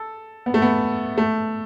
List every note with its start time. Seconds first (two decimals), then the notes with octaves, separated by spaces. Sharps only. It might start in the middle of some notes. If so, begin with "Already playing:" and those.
Already playing: A4
0.46 B3
0.54 A3
0.62 B3
1.18 A3